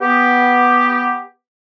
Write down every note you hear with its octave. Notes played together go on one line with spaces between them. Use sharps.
B3 G4